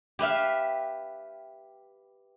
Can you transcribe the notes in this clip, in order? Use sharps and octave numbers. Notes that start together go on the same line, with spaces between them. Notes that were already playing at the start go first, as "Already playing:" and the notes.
G4 B4 E5 F5